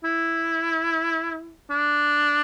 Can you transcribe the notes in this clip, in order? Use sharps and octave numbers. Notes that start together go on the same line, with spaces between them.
E4
D4